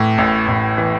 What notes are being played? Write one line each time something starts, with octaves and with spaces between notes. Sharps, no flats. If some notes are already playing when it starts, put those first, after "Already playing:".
Already playing: A2 E3
A1
A1
E3